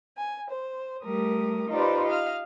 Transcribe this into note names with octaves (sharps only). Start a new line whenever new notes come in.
G#5
C5
G3 A3 A#4 D#6
D#4 F4 G4 B4 C5 D5
D#5 F5 F6